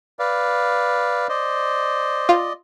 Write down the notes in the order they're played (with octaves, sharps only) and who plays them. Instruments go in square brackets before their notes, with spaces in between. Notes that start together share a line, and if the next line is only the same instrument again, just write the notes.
[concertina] B4 D5 F5
[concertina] C5 [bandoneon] D5 D#5
[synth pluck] F4